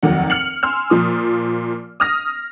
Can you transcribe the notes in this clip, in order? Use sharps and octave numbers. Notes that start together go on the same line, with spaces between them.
F1 D#2 D#3 F#3 F#5
F6 C#7 F#7
G#5 C6 E6 F6
A#2 F3 D#6
D#6 F6 A#6